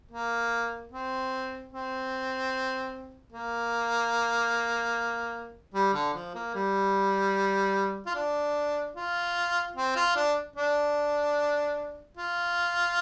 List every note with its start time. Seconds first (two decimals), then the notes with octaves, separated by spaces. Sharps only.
0.11 A#3
0.92 C4
1.73 C4
3.33 A#3
5.74 G3
5.94 D3
6.14 F3
6.35 A#3
6.55 G3
8.06 F4
8.15 D4
8.96 F4
9.76 C4
9.96 F4
10.16 D4
10.56 D4
12.17 F4